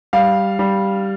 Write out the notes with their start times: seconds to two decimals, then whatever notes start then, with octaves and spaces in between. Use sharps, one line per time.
0.13 G3 F5
0.59 G3